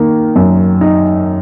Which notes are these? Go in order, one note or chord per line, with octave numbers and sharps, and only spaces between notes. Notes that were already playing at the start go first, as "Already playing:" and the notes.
Already playing: D#3 A#3
F#2
D#4